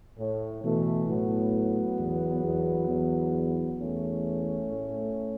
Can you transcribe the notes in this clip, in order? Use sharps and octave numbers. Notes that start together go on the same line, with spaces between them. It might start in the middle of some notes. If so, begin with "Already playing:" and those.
A2
B2 E3 A3
A2 F#3 B3
E2
E2
E2
E2 A3 C#4
A2